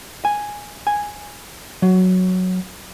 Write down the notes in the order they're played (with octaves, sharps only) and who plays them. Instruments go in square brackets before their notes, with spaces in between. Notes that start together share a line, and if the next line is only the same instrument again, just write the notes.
[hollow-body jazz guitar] G#5
G#5
F#3